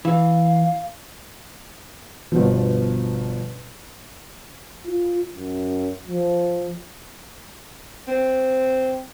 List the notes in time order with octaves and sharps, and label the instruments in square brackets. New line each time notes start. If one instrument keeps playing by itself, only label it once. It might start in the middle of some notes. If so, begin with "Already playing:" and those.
[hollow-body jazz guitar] E3 [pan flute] F5
[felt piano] G1 B2 F3
[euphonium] F4
F#2
F3
[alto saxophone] C4